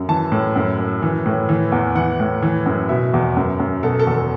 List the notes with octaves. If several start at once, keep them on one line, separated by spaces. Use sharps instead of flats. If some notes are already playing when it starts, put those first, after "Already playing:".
Already playing: F#2
E3 A5
A2
F#2
F#2
E3
A2
E3
E2
E3 F#5
A2
E3
F#2
B2 E5
E2
F#2
F#2
B2 A4
A4
E2
A4